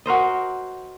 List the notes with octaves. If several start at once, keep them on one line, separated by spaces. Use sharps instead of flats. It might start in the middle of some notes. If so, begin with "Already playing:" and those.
F#4 A#4 C5 D#5